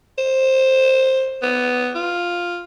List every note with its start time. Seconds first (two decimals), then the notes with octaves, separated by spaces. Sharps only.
0.18 C5
1.42 B3
1.95 F4